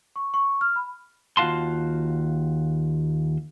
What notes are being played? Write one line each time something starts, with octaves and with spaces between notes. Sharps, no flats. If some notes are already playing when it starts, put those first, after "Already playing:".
C#6
C#6
F6
B5
D#2 F4 F#4 F5 A5 C6